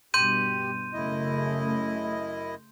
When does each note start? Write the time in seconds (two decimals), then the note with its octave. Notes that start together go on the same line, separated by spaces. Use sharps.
0.14 G2 B2 G4 C6 G6 D#7
0.93 F#2 C#3 A3 E4 D#5